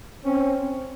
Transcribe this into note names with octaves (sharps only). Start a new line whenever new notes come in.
C4 C#4